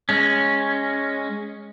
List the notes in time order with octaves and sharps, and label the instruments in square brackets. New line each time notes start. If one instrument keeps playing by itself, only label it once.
[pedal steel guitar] G#3 C#4